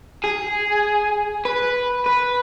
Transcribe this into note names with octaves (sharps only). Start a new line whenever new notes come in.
G#4
B4
B4